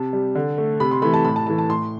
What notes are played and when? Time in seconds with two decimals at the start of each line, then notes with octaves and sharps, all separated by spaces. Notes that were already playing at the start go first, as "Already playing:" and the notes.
Already playing: C3 A5
0.13 G3
0.35 D3
0.58 A3
0.80 C3 B5
0.91 C6
1.02 E3 A3 B5
1.14 A5
1.25 A2 B5
1.36 A5
1.47 E3 A3 A5
1.58 A5
1.69 A2 C6